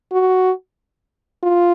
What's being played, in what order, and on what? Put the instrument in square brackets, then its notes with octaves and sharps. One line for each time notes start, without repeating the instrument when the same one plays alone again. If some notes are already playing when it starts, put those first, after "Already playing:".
[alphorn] F#4
F4